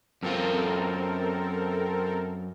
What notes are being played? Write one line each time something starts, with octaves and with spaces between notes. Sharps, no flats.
F#2 C4 F4 A4 A#4